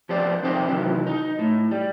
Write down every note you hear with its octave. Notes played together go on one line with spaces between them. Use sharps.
F3 B3 G4 C5 D5
C2 F2 D#3 C4 G4 C5
C3 D#3 E3 F#3
D#4
A2
G3